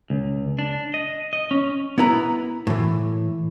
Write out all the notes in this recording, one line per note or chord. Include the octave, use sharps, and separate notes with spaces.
C#2
D4
D#5
D#5
C#4
B3 E4 B4 A#5
A2 E3